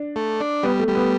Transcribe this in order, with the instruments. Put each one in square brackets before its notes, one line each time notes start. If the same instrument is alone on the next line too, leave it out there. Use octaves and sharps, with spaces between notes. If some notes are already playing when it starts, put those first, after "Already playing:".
Already playing: [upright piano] D4
[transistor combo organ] A3
D4
[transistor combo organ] G3 [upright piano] B3
[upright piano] A3
[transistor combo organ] G3
[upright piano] B3